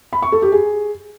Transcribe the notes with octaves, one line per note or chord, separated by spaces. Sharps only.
B5
C#6
A4
G4
G#4